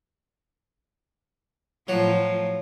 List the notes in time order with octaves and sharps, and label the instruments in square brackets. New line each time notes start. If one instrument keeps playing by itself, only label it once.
[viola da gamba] A2 F3 [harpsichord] F#3